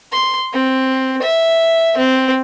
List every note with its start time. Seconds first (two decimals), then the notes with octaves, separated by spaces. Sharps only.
0.12 C6
0.53 C4
1.22 E5
1.97 C4